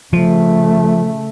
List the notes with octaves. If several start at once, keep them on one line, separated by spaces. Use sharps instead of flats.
C#3 F3 A3